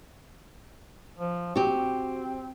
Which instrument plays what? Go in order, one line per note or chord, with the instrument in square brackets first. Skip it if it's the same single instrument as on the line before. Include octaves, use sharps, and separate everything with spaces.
[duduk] F3
[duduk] C4 [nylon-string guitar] F#4 G4